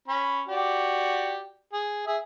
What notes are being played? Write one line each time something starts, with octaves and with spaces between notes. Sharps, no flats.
C#4 B5
F#4 G4 D5
G#4
G#4 E5